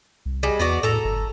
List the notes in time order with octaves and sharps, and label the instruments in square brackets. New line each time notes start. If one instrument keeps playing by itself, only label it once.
[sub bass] C2
[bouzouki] G3 G#3
[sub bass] E2 [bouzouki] B3 F#4 D5
[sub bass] A2 [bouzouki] A4 A#5
[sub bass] G1